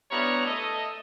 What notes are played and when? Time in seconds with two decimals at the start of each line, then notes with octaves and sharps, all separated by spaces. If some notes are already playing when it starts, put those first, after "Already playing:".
0.11 G3 B3 D4 E4 C#5 A#5
0.46 A3 A4 D#5